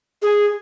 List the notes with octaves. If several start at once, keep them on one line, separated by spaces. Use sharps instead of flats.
G#4